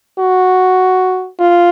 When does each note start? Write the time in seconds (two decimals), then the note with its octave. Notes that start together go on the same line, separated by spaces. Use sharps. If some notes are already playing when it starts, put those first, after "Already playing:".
0.19 F#4
1.39 F4